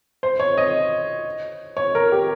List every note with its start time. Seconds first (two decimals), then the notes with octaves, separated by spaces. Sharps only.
0.23 C5
0.40 C#5
0.58 D#5
1.77 C#5
1.95 A#4
2.12 G4